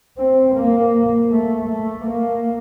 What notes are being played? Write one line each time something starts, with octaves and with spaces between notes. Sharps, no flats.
C4
A#3
A3
A3
A#3